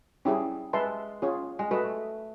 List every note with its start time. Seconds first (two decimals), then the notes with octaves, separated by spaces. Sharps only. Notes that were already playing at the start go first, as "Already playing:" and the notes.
0.25 G3 C#4 E4 G#4
0.73 G#3 B4 E5 A5 C6
1.22 C#4 F4 G#4 C#5
1.59 G#3
1.71 A3 F#4 B4 D#5